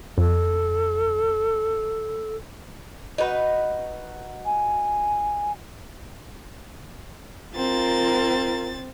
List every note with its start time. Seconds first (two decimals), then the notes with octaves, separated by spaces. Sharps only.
0.18 F2 A4
3.18 D#4 F#4 B4
4.46 G#5
7.56 C4 F4 A#4 A6